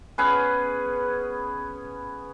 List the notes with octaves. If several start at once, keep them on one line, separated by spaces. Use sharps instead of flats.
B3 C#4 G#4 B4